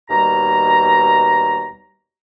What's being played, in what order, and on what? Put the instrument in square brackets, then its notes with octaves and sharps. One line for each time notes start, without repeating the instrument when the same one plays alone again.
[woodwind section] D#2 B2 G3 A#5